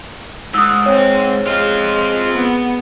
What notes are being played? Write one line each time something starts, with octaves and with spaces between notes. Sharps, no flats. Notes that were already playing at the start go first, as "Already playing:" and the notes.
G#2 D#6 E6
C4 C#5
G#3 C4 F4
B3